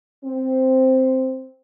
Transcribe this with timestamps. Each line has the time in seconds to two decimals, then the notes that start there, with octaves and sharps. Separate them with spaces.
0.24 C4